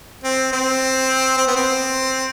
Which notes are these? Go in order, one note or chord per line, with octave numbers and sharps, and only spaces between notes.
C4
C4
C4
B3
C4